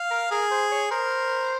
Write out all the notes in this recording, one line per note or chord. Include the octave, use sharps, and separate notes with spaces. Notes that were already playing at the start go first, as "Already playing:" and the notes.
Already playing: F5
A#4
G#4 A#4
C5
C#5
A#4 C5